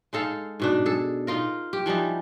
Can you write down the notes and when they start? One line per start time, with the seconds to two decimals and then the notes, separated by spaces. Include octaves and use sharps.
0.13 G#3 D#4 A4 F5
0.60 G#2 B2 D4
0.86 G#4 A4
1.27 D#4 F4 A#4
1.73 G4
1.86 E3 F3 G3 D#4